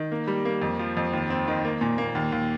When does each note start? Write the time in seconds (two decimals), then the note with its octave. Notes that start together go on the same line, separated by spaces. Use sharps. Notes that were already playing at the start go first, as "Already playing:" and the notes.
Already playing: D#3
0.12 A#3
0.28 G3
0.45 A#3
0.62 F2
0.79 F3
0.97 F2
1.13 D#2
1.30 C4
1.48 D#3
1.65 A#3
1.81 A#2
1.98 A#3
2.15 D#2
2.32 D#2